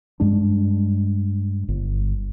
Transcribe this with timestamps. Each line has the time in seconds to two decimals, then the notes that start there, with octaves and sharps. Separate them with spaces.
0.20 G2 G#3 D4
1.68 G1